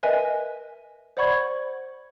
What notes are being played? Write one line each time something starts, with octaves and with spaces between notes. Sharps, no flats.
A#4 B4 D#5 E5 G#5
C5 D5 F#5 B5 C#6 G#6